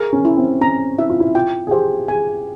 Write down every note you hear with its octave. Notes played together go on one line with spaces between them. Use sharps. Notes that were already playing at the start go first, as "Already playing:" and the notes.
Already playing: G#4 A#4
C#4
E4
C4
C#4 A#5
E4 E5
F4
E4
F4 G5
G#4
G4 C5
G#4 G#5